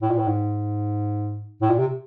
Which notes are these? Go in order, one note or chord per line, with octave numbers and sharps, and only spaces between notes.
A2
A#2
A2
G#2
A2
A#2
C3